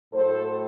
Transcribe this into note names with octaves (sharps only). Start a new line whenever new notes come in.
A2 F#3 A3 A4 C5